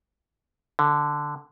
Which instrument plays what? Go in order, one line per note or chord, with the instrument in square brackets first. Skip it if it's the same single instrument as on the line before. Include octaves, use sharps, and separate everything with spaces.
[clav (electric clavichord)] D3